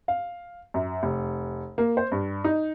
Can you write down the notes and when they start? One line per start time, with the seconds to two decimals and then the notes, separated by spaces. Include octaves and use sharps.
0.08 F5
0.74 F#2
1.03 F1
1.78 A#3
1.97 C5
2.12 G2
2.44 D#4